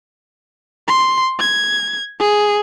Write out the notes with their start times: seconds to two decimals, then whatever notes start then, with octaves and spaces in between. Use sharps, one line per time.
0.88 C6
1.40 G#6
2.19 G#4